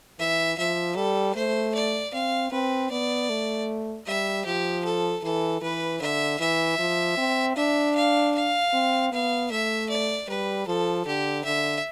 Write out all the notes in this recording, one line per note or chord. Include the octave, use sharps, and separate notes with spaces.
E3 E5
F3 E5
G3 A4
A3 C5
D5
C4 F5
C4 B4
B3 D5
A3
G3 E5
F3 G4
A4
E3 A4
E3 B4
D3 E5
E3 E5
F3
C4
D4 E5
F5
F5
C4
B3 F5
A3 E5
D5
G3 B4
F3 A4
D3 G4
D3 E5